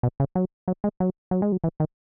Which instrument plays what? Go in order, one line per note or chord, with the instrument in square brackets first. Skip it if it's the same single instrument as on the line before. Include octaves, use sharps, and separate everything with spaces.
[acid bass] B2
C#3
F#3
F#3
G#3
F#3
F#3
G#3
F#3
E3
D#3